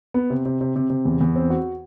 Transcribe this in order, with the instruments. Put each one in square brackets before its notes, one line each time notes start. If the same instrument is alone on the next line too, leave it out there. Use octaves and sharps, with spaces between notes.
[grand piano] B3
C3
C3
C3
C3
C3
E2
E2
C4
F#4